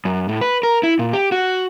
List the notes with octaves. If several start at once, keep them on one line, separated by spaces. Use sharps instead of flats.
F#2
A2
B4
A#4
E4
A#2
G4
F#4